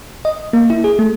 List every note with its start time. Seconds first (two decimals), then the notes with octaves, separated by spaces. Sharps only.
0.25 D#5
0.53 A#3
0.70 E4
0.84 G#4
0.99 A3